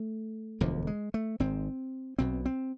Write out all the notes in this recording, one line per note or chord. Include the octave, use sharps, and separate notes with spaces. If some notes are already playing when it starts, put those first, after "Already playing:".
Already playing: A3
E1 D2 D3 F3
G#3
A3
G#1 G#2 C4
B1 B2 C4
C4